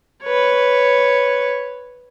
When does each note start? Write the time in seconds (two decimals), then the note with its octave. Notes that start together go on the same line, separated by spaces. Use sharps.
0.23 B4 C#5